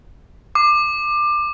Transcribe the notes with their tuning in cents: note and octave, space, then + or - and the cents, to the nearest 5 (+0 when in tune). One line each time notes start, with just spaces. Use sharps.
D6 +20